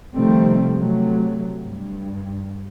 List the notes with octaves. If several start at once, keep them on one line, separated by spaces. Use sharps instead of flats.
C3 D#3 F3 G3 A3 C4
C3 F#3 A3
G2